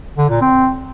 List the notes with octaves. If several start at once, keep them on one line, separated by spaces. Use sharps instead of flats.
D3
A#2
C4